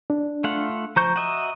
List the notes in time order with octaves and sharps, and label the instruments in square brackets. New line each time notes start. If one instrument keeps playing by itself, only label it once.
[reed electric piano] D4
[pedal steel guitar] A3 F4 F#5
[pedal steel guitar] F3 C5 G6 [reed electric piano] A#5 C#6
[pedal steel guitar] F#4 D#5 E5